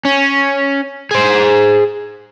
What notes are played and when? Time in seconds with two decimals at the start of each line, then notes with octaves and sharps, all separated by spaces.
0.05 C#4
1.11 G#4 C5